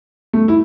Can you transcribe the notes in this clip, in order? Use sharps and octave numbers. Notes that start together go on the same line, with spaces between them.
A3
E4